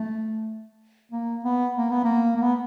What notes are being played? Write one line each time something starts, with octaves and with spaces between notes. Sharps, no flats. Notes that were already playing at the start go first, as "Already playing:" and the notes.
Already playing: A3
A#3
B3
A#3
B3
A#3
A#3
B3